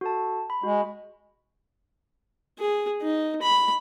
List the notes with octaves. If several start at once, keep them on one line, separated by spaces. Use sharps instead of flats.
F#4 A4 A5
B5
G#3 F#4
G#4
D#4
B5